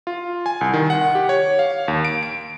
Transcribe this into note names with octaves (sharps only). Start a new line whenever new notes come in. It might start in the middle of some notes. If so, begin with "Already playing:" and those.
F4
G#5
C2
D#3
F#5
G4
C#5
F5
D#2
D7
D7